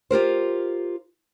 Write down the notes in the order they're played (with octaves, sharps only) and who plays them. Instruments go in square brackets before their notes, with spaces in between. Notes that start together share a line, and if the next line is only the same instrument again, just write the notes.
[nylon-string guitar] F4 G4 A#4 C5